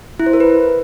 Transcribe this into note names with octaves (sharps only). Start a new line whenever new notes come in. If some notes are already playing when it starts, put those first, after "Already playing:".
E4
C5
A#4
B4